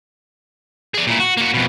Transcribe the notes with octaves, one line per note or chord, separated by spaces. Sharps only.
G#4 D5
A#2 E4
F#4
A#3 F#4
F2 B2